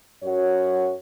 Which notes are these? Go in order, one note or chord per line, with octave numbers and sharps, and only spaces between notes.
F#2 F#4 C#5